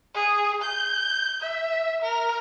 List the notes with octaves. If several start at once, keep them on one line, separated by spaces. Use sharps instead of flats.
G#4
G6
E5
A#4